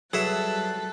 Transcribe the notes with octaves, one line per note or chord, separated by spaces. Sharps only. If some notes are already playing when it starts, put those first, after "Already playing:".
F#3 G3 G#4 A4 B4 E5 F#6